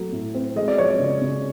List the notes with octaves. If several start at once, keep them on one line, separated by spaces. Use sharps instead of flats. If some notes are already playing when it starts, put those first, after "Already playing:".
Already playing: F#3 A3
A2
C4
G#3 D#5
D5
F3 C#5
D5
C#3
C#3